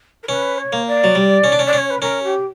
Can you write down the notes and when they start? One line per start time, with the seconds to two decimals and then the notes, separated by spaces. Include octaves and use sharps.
0.23 A#4
0.28 C#4 B4
0.58 C#5
0.73 A#3
0.87 D5
1.04 F#3
1.15 G3
1.44 C#4
1.52 D4
1.59 C#4
1.66 D5
1.73 C#4
1.78 C#5
1.90 B4
2.01 C#4 A#4
2.24 G4